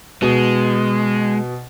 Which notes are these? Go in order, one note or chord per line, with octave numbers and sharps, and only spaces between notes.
B2 G#3